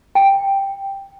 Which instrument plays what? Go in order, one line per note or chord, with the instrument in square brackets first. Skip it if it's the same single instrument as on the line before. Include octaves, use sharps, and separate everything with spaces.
[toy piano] G5